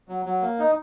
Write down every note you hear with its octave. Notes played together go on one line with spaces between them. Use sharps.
F#3
F#3
A#3
D#4